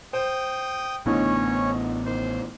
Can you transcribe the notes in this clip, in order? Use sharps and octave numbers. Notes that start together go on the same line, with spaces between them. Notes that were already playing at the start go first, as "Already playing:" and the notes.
C5 G5 D#6
A1 A2 D3 B3 C#4 D#4 C#5
D#3 C5